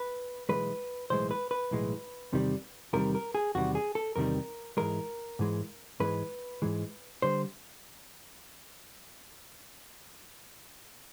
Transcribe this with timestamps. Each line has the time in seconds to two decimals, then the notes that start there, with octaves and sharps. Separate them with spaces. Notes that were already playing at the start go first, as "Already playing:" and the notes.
Already playing: B4
0.49 B1 A2 E3 G#3 B4
1.10 B1 A2 E3 G#3 C5
1.31 B4
1.51 B4
1.71 B1 A2 E3 G#3
2.33 E2 C3 D#3 G3
2.93 E2 C3 D#3 G3 A#4
3.15 A#4
3.35 G#4
3.55 E2 C3 D#3 G3 F#4
3.75 G#4
3.95 A4
4.16 E2 C3 D#3 G3 A#4
4.77 G#2 E3 G#3 A#4
5.39 G#2 E3 G#3
6.00 G#2 E3 G#3 B4
6.62 G#2 E3 G#3
7.22 D3 G3 C5